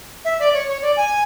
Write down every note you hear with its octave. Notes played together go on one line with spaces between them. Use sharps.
E5
D5
C#5
C#5
D5
G#5